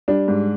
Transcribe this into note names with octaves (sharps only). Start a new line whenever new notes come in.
G3 D4
G#2